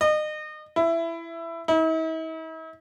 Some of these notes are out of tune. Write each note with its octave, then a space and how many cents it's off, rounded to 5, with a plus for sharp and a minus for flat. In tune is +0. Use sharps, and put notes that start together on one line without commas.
D#5 -30
E4 +15
E4 -45